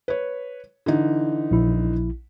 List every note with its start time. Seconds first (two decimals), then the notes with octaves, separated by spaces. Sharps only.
0.08 B4 C#5
0.86 D3 E3 D#4
1.51 A#1 E4